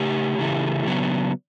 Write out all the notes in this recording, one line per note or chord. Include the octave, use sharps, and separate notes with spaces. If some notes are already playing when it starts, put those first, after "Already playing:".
Already playing: C#3 A3 G4
C#3 E3 A3
C#3 F#3 B3